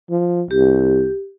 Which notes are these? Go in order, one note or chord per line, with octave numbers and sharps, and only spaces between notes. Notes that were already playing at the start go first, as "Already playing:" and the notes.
F3
C2 G4